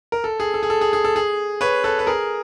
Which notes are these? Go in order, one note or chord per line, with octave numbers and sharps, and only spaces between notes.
A#4
A4
G#4
A4
G#4
A4
G#4
G#4
A4
G#4
B4 C#5
A4 B4
B4
G#4 A#4